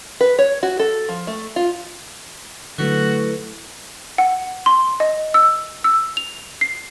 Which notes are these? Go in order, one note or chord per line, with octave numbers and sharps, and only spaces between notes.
B4
C#5
F#4
A4
F3
A3
F4
D3 F#3 A3 E4 F#4 A4 B4
F#5
C6
D#5
E6
E6
F7
C7